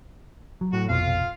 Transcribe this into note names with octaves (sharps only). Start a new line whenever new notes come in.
F#3
A2 F#4
F1 A#1 F2 B2 F4 F5